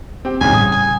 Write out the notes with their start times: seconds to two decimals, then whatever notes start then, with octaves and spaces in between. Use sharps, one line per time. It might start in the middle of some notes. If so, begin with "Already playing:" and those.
0.25 C4 G4 G5
0.41 D#1 E2 G#2 C#3 A#3 C#4 G#5
0.53 A2 C#3 G3 D#6
0.72 G#5